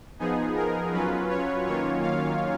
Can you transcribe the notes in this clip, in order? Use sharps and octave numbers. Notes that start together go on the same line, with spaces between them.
F3 B3 D#4 G#4
A#4
F#3 C#4 F4 B4
C#5
D#3 F#3 A#3 C#4 F4 C#5
F5